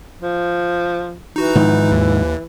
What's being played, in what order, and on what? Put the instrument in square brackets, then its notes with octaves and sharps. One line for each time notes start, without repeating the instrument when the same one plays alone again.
[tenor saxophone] F3
[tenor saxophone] E3 [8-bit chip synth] D#4 F#4 A#5
[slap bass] G#2 D#3 F3 [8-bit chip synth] D#4
[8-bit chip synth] D#2